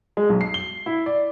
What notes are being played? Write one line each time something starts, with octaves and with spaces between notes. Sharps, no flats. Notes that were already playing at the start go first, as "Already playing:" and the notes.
G#3
B1
C7
G7
E4
D5